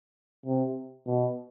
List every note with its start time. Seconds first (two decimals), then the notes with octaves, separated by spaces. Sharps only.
0.46 C3
1.07 B2